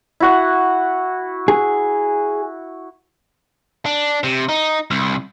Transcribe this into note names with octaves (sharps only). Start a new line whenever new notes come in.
E4 F#4 F#5
G#4
D4
C3
D#4
C2